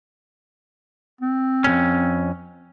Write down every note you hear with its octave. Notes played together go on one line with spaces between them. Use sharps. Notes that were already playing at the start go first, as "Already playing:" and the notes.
C4
F2 A#2 C#4